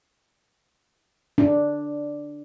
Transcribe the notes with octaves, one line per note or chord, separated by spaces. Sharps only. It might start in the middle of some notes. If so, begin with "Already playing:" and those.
D4